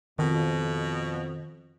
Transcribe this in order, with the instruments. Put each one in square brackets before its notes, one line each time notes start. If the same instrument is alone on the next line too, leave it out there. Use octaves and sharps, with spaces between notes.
[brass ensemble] F2 [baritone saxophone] B2 [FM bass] D#3